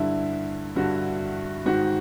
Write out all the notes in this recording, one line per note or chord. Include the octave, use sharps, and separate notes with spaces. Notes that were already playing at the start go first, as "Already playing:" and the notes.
Already playing: G2 D3 E4
G2 D3 F#4
G#2 D#3 F#4